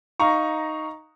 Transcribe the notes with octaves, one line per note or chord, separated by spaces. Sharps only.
D#4 F5 A#5 C#6